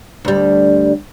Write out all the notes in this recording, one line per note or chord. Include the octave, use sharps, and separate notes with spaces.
D2 G3